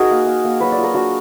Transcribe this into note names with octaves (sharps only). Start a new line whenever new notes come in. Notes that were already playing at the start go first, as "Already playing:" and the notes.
Already playing: D#4 F#4 G#4 A#4
A#3
A#3
A#3
F#3 B4
D5
F4
A#4
D4 F#4